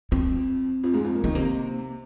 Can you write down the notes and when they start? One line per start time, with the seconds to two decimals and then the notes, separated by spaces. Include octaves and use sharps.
0.11 F2 F3 C4
0.84 F2 F3
0.94 G#2 G#3
1.04 F2 F3
1.15 A#2 A#3
1.24 D#3 C4 D#4
1.35 C3 A#3 C4